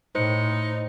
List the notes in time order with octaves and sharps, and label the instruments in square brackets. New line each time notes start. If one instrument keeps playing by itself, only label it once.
[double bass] A2 [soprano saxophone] D#4 [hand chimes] C5 C#7